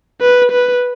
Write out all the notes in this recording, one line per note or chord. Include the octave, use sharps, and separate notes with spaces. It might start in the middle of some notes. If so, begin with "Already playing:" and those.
B4
B4